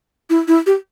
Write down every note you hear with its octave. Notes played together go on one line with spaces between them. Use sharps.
E4
E4
G4